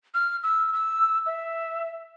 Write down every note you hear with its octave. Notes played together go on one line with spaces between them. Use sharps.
F6
E6
E6
E5